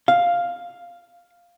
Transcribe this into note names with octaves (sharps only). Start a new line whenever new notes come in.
F5